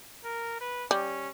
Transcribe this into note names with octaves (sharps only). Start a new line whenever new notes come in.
A#4
B4
G3 C#4